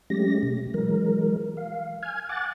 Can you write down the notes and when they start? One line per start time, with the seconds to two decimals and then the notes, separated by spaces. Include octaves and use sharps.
0.10 F#3 G#3 A3 C#4 G4 A#6
0.43 B2
0.74 E3 F#3 G#3 A#4
1.57 F5
2.03 G#5 F6 G#6
2.29 F#5 G#5 D6 F#6 A6